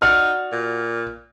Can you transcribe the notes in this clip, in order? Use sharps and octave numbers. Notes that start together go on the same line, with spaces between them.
D#4 F#4 D5 F#5 F6
A#2